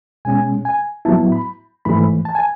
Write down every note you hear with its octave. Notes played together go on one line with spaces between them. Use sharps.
B2 G#3 C#4 G#5
G#5
A2 F#3 B3 E4 A5
B5
G#2 E3 A3 B5
A5
G#5